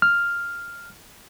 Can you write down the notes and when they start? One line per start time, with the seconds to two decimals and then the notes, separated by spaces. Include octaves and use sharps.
0.02 F6